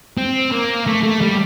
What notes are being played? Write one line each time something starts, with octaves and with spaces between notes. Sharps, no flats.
C4
A#3
A3
A3
G3